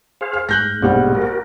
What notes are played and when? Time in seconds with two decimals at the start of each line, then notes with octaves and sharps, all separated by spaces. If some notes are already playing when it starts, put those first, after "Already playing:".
0.21 G#4 C5 F5
0.33 F6
0.49 G#2 F#6 G6 A#6
0.82 A#1 G#2 B2 G3 G#3 F#5
1.15 F#4 A#4